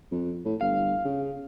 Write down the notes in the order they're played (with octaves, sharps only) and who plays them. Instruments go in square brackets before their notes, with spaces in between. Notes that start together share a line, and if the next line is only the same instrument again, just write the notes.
[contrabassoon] F2
A2
[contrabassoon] G1 [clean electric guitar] F5
[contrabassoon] C#3